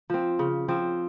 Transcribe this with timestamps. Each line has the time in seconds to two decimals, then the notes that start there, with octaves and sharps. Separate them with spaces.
0.10 F3 C4
0.39 C#3
0.68 F3 C4